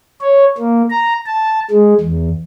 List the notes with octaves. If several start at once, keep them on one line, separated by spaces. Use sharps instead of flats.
C#5
A#3
A#5
A5
G#3
E2